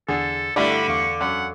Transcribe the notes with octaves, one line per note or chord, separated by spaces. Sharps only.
E2 D3 G#4 A4
G2 D3 A3 D4 E4 D5 B5
E2 F5 C#6 D6
F#2 F#5